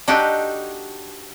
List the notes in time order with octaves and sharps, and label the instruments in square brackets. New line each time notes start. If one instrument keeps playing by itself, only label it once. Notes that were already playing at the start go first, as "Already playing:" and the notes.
[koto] D4 D#4 F#4 G4 A4